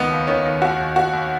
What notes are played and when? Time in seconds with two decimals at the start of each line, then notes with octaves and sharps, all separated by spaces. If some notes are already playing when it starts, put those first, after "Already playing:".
Already playing: C#2 D#3 B3
0.10 D#2
0.27 D#3 C#4
0.45 D#3
0.61 D#2 F#4
0.80 D#2
0.96 D#2 F#4
1.13 D#2